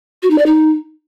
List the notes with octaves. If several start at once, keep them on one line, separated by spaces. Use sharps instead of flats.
F#4
D#4
D5
D#4